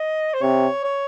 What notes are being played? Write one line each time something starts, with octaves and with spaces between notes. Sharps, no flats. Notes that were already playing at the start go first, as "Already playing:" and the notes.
Already playing: D#5
C5
C3 C#5
C#5